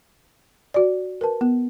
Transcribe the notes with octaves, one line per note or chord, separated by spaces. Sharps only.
F#4 D5
A#4 B4 A5
B3